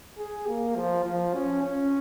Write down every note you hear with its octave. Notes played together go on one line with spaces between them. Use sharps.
G#4
A#3
F3
F3
C#4
C#4